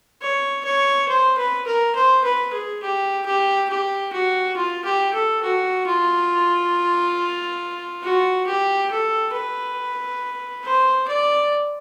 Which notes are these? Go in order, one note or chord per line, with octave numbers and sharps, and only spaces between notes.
C#5
C#5
C5
B4
A#4
C5
B4
G#4
G4
G4
G4
F#4
F4
G4
A4
F#4
F4
F#4
G4
A4
B4
C5
D5